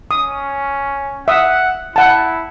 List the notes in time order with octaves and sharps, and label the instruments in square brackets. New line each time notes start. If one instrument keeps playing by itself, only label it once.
[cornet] C#4 [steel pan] D#6
[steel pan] E5 D#6 [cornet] F#5
[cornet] E4 [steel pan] F#5 A5